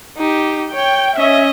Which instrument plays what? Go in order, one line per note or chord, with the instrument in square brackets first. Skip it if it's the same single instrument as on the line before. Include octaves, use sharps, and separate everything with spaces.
[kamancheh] D#4 G4
[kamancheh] C#5 [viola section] G5
[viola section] C#4 E5 [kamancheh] D#5